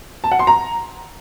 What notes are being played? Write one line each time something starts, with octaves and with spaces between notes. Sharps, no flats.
A5
F#5
C6
A#5